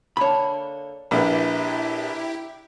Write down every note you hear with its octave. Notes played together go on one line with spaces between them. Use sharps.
D3 A#3 D4 C#5 B5
A#1 E4 G4 B4 F5